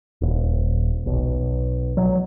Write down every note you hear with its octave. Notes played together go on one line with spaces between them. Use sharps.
D#1
B1
F#3